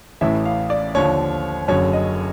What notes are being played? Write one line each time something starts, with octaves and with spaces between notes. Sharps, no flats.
A1 A2 E3 E5
F5
D5
D#2 D3 F3 C#5
F#1 F#2 D3 C#5
D#5